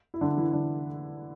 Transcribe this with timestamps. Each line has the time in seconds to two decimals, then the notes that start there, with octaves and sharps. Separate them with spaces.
0.14 E4
0.21 D3 D4
0.37 E3 E4
0.53 D3 D4